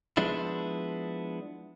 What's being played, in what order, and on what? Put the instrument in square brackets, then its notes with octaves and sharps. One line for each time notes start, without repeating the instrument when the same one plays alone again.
[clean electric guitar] F3 G#3 B3 D4 E4